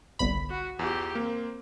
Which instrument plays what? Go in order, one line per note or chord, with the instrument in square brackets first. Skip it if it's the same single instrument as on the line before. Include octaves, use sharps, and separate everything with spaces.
[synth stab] G1 C2 B5
[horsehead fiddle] F#4
[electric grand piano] E2 [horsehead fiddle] F4 G4
[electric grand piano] A#3 [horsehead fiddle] C4